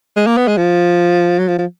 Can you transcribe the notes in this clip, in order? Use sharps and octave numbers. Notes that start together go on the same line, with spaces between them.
G#3
A#3
B3
G#3
F3
F#3
F3
F3